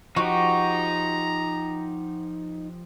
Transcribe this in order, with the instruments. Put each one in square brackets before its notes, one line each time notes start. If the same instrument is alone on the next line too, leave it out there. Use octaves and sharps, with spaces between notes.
[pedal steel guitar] F3 G4 [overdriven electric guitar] D#4 [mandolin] F#4 [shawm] A#5